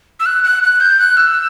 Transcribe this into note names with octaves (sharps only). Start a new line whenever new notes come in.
E6
F#6
F#6
F#6
G6
F#6
E6